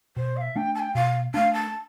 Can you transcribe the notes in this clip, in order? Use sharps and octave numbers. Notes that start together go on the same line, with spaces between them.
B2 C5
F5
E5
A3 D4 G5
A5
G5
B2 F5
A3 D4 F5
A5